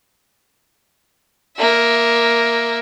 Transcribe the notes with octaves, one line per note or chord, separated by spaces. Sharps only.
A#3 E5